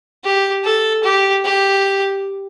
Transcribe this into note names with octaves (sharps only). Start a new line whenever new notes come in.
G4
A4
G4
G4